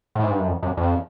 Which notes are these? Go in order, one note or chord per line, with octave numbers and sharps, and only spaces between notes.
A2
G#2
G2
F#2
F2
F#2
F2